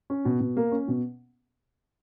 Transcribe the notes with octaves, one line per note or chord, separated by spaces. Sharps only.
C#4
B2
B2
A#3
C#4
B2